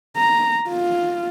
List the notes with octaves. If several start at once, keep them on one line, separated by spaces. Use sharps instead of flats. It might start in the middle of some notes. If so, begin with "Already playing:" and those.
A#5
F4